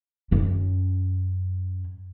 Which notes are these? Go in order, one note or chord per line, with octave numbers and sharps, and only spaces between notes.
F#2 C#4